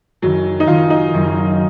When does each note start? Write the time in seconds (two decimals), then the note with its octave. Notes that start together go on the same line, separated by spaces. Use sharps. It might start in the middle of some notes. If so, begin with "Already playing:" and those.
0.22 F#1 F#2 D#3 F#3
0.60 D#4
0.68 F#1 F#2 D#3 F4
0.90 D#4
1.14 F#1 F#2 D#3